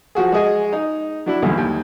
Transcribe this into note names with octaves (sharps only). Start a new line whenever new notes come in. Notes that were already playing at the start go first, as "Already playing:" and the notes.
F3 F#3 F#4 G#4
G#3 F#4 G#4 D#5 G#5
D#4
F#3 D4 E4
B1 E2 G2 A#2 D3 E3
D#2